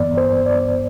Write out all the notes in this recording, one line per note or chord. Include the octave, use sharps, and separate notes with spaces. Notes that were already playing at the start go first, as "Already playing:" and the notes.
Already playing: G2 E3 B3 D5
C5
D5